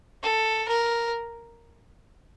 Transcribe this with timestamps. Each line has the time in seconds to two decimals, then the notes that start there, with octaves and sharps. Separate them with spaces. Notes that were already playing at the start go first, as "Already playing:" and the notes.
0.23 A4
0.68 A#4